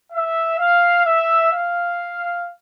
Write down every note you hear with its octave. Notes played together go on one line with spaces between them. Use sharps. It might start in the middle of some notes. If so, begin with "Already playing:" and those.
E5
F5
E5
F5